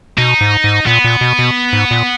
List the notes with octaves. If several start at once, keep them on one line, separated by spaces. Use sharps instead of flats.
B2 D#4
G#2
G#2
A#2 B3
A#2
B2
B2
G#2
A#2